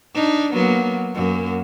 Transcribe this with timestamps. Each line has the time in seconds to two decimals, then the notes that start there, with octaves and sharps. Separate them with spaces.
0.14 D4 D#4
0.52 F#3 A#3 B3
1.15 F#2 A#3